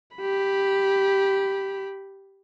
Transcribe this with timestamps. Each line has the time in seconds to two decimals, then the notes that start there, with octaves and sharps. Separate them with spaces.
0.17 G4 B5